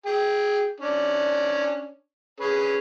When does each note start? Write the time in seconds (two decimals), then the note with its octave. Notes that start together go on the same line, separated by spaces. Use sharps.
0.06 G#4 G5
0.80 C#4 D4 D5
2.40 C#4 G#4 B4